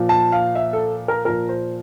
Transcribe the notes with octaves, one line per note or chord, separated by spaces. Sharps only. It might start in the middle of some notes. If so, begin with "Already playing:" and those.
Already playing: A#2 F3
A5
F5
E5
A4
A#4
A#2 F3 A#4
C5